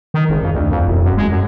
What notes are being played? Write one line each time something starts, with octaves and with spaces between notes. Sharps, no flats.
D#3
G#1
F2
D2
F2
E1
F#2
G#3
F#2